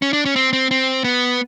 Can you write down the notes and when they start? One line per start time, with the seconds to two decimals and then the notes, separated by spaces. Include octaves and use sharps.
0.02 C#4
0.13 D4
0.25 C#4
0.36 C4
0.53 C4
0.71 C4
1.04 B3